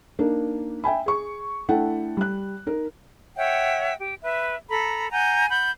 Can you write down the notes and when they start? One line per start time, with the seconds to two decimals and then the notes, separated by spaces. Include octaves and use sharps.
0.19 A#3 D4 D#4 A#4
0.84 E5 G5 G#5 B5
1.06 G#4 C#6
1.69 A3 D4 E4 A4 F#5 G5
2.17 G3 F#6
2.66 D#4 A#4
3.37 C#5 E5 F#5 G5
4.00 G4
4.23 B4 E5
4.69 A4 A#5 B5
5.11 F#5 G#5 A#5 G6
5.50 F#5 B5 G6